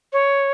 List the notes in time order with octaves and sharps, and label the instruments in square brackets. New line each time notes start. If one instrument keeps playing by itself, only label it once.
[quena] C#5